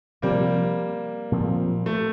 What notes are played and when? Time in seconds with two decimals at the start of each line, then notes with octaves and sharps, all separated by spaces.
0.22 C3 F3 G3 A#3 C4
1.32 A#2 F3 C4
1.86 A3